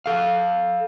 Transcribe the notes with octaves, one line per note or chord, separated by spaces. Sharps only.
A4 F5